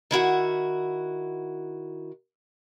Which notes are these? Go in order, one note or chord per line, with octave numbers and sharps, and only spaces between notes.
D#3 E4 F#4 F#5